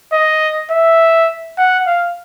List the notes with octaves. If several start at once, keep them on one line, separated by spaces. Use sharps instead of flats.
D#5
E5
F#5
F5